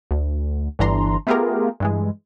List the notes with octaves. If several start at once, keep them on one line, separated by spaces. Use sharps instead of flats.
D2
G1 G2 E3 D4 A#5 C6
A3 B3 F4 G4 G#4 A#4
G2 E3 G#3